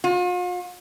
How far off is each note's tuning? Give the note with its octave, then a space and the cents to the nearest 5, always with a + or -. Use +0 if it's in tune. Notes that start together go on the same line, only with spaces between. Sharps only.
F4 +45